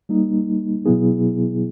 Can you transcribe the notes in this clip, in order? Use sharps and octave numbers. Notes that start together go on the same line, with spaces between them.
G3 A#3 D#4
B2 F#3 B3 E4 G#4